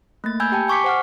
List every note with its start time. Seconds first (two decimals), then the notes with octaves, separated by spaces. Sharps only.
0.24 A3 A#3 A6
0.40 G#5 B5 E6 G6 G#6
0.52 G4 G5 A5
0.68 G#5 C#6 D6 B6 C#7
0.84 C5 F#5 F6